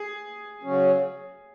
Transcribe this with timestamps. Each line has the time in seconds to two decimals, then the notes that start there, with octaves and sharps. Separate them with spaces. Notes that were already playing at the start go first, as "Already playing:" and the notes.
Already playing: G#4
0.63 C#3 F#3 C#4